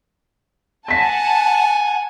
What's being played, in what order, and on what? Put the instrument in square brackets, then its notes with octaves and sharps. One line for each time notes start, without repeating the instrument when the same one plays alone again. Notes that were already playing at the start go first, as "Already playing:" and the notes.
[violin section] F#5 A5 [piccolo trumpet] G#5 [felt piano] A#6 B6